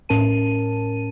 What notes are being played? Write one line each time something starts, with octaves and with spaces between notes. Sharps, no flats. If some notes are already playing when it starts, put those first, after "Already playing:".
A2 C#4 A#4 A5 D#7